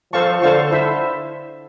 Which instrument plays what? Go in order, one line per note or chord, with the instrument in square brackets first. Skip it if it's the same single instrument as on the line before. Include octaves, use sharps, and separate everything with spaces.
[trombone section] F3 [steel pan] A4 C5 F5 A5 C#6
[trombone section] D3 [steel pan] A4 C5 F5 A5 C#6
[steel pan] E4 A4 C5 E5